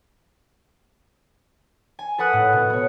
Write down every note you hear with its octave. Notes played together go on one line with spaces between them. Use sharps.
G#5
A4 B4 F#5 D#6 F#6
A2
B2
B3 C#5